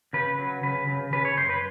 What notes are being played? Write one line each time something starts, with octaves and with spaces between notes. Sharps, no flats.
C#3 B4
F#3
C#3 B4
C#3
C#3 B4
C#5
F#2 C5
B4